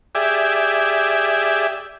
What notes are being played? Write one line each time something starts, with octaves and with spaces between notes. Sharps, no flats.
G4 G#4 D5 E5